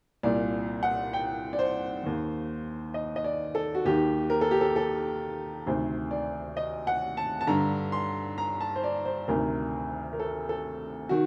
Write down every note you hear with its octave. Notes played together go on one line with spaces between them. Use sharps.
C2 A#2 D5
F#5
G5
D5
C5
D#2 D#3
D#5
D#5
D5
A4
F#4
D#2 D#3 G4
A#4
A4
G4
A4
A4
D2 C3 D#3 C5
D5
D#5
F#5
A5
A5
G2 D3 A#5
C6
A#5
A5
C5
D5
C5
D2 C3 D#3 A#4
A#4
A4
A4
D#3 F#4